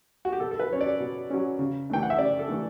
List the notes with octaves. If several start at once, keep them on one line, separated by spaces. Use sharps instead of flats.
F#4
G4
B2 A4
A4
B4
F#3 C#4 C#5
D5
B2
F#3 C#4
C#3
E3 A3 D4 G5
F#5
E5
C#3 D5
A4
E3 A3 D4